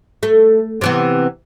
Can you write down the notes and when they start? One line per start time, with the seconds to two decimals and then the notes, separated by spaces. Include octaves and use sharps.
0.23 A3
0.81 C3 E3 B3